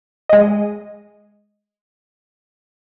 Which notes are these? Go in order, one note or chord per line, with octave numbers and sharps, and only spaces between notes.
G#3 D#5